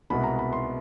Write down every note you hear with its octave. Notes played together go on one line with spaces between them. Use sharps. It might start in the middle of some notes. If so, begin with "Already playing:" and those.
C2 B2 G#3 B3 B5
A#5
B5
C6